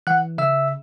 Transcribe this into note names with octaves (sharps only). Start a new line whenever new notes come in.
E3 F#5 F#6
C#3 E5 E6